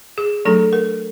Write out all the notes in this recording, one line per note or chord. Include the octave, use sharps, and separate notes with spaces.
G#4
F#3 A3 D4 A4
A#4